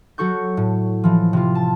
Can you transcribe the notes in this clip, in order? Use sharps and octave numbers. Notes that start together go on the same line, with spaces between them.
F#3 F#4 A4 C#6 G6
A2
E3 F3
C3 F4
A5